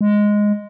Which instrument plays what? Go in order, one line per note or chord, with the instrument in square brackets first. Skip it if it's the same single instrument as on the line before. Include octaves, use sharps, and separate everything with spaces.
[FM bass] G#3